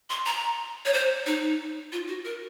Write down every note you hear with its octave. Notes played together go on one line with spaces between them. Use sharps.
C6
A#5
C#5
C5
D#4
F4
F#4
A#4